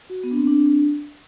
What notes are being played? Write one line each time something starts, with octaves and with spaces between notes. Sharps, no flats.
F#4
B3
D4
C4
D4
C4
D4